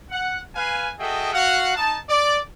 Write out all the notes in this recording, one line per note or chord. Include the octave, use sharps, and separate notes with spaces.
F#5
B4 F5 G#5
F#4 G#4 A4 D#5 E5 G5
F#4 F5 F#5
D#4 A5
D5